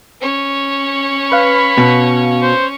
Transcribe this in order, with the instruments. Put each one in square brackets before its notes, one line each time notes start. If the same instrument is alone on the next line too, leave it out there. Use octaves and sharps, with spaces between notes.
[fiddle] C#4 C#5
[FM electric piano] B4 F5 [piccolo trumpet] B5
[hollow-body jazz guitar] B2
[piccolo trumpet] C5